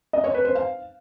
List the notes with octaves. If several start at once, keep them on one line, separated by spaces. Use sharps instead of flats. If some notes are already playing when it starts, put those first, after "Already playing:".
D#5
C#5
B4
C5
F5